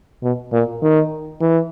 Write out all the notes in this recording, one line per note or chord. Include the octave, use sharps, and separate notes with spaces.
B2
A#2
D#3
E3